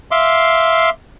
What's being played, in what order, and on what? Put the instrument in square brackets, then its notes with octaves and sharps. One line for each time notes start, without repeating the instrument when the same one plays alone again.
[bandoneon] E5 F5 C6 D6